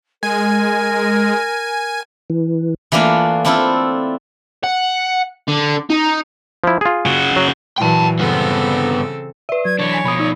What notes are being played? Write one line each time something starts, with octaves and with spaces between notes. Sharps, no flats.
G#3 A#4 G#5
E3
E3 A3 A#3 D4 F4
C4 D4 E4 F4 A4
F#5
D3
D#4
F3 E4
F4 G#4
C#3 F#4
F#3
A#2 E3 F#3 G5 A5
G2 C#3 B3 C4 A4
B4 D5 E5
F#3 G#6
E3 D4 C#5
G#5 B6 D7
B2 F3 B5 D#6
D#4 D5